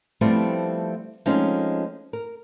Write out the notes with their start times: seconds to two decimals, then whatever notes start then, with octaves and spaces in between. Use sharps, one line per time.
0.21 F3 G3 A3 B3 C4 E4
1.26 F3 G#3 A3 C4 C#4 D#4
2.13 A#4